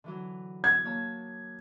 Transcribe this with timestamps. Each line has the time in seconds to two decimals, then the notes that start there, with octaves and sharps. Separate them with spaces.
0.04 D3 E3 F#3
0.64 G#6
0.84 A#3 C#5 A5